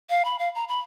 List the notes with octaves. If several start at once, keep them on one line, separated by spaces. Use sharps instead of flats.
F5
B5
F5
A#5
B5